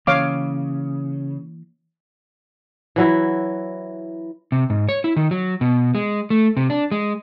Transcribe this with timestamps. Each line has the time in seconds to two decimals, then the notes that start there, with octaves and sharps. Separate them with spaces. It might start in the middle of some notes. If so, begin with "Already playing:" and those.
0.07 C#3 E3 A#3 C#5 F5 D6
2.96 E3 F#3 E4
4.52 C3
4.70 G#2
4.89 C#5
5.04 E4
5.16 D#3
5.31 F#3
5.61 B2
5.95 G#3
6.30 A3
6.57 C3
6.70 D4
6.91 G#3